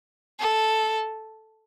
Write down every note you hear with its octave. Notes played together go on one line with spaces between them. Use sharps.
A4